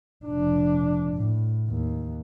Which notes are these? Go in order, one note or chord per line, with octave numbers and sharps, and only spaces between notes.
F1 D4
A2
D#2